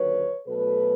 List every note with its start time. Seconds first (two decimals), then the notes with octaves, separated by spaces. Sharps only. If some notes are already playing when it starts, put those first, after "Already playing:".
Already playing: D#2 D3 F#3 B4 C#5
0.47 B2 F#3 A3 A4 B4